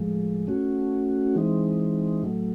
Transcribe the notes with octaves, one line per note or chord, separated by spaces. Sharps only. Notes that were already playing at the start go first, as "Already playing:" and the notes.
Already playing: A2 F3 G#3
A3 C#4 F#4
E3 G#3 C4 D#4
A2 F#3 A3